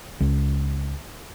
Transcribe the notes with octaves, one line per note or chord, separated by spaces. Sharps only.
C#2